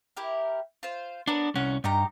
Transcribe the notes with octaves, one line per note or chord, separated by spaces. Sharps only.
E4 G4 A#4
F4 C5
B3 D4 A#4 C#5
C2 C#4 F#5
G2 D#4 G4 A#5